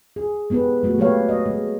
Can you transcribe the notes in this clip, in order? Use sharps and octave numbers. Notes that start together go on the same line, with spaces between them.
G#4
G#3 B3 E4 G4 B4
G#3 A3 F#4
F#3 A#3 G4 B4 C#5 F5
D#5
G#3